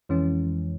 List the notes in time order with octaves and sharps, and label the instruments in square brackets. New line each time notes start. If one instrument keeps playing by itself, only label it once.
[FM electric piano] F2 E3 G#3 C#4